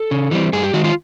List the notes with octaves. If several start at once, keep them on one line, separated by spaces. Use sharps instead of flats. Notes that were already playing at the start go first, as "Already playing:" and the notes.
Already playing: A4
C#3
E3 G3 C4
G2 G#4
G4
D#3 G#3 F#4
F4